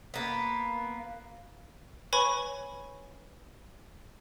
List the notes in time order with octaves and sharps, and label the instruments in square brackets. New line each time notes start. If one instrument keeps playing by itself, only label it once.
[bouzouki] A#3 B3
[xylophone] B4 C#5 G#5 B5 C#6